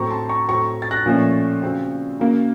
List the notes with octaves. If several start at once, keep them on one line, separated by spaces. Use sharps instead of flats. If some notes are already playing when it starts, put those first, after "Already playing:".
Already playing: A2 F#3 C4 A#5 C#6
A5 C6
A#5 C#6
A2 F#3 C4 A#5 C#6
A6
F#6 A#6
A#2 F3 A3 C#4
C#3 F#3 C4
C#3 F#3 A#3